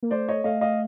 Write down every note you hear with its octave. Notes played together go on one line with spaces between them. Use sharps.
A#3
A3 C5 D5
C#5 D#5
A3 D#5 F5
D#5 F5